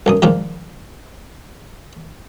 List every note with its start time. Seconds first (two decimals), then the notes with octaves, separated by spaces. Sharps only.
0.06 B1 F#2 D#6
0.22 A#2 D#3 F3 G#3